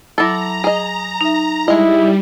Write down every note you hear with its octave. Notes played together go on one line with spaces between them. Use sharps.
F#3 E4 A4 A#5 D6 A#6
G#4 D#5
D#4 E5
G3 G#3 E4 D#5